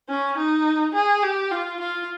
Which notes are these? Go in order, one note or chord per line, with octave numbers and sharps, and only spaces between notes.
C#4
D#4
G#4
G4
F4
F4